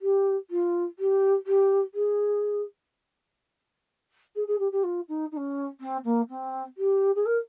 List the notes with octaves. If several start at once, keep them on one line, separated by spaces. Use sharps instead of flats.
G4
F4
G4
G4
G#4
G#4
G#4
G4
G4
F4
D#4
D#4
C#4
C4
A#3
C4
G4
G#4
A#4